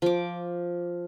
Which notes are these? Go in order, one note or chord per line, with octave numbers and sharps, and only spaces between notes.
F3 D6